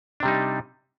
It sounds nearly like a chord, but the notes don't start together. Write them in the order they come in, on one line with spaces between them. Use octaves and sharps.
D4 C3 G3 D#4